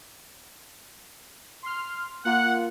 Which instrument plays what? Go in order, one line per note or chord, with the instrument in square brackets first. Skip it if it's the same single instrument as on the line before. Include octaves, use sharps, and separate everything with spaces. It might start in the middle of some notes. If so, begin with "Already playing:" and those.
[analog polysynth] C6 F6
[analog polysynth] A#3 F4 [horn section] F#5